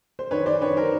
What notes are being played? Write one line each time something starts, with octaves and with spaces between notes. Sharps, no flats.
C5
D#3 B4 C#5
C5 D5
D#3 B4 C#5
A#4 C5